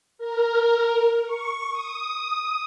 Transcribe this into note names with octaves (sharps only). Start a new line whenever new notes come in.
A#4
C#6
D#6